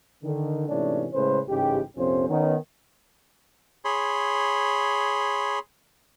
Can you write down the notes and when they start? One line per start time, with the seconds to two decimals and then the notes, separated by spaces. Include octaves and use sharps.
0.24 D3 D#3
0.69 G#2 C3 E3 A3 C#4 D4
1.14 A2 C#3 G#3 C#4 B4 C5
1.49 A1 G#2 C#3 G#3 G4
1.97 A#1 F2 C3 F3 C#4 C5
2.28 D#3 B3 C#4
3.85 G#4 C#5 B5 C6